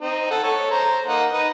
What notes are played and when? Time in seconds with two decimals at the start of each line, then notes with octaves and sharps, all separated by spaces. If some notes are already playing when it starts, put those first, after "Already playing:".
0.01 C4 D#4
0.31 A4 F#5
0.43 A4 C#5
0.71 C5 A#5
1.07 A#3 D#4 F#5
1.33 D#4 B4